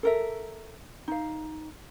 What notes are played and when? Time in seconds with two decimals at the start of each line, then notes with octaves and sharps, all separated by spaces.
0.03 A4 A#4 E5
1.08 D#4 F5